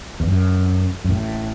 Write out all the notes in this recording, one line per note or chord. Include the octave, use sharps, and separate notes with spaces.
E2
F#2
F#2
A1 A2